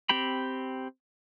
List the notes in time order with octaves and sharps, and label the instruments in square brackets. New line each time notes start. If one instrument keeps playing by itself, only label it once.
[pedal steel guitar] C4 G4 G5 B5